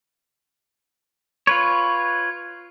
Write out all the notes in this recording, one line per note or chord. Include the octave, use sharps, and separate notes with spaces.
F4 B4 C#5